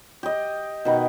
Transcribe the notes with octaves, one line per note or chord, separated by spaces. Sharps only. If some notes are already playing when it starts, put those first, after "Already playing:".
G4 D#5
B2 D#3 B4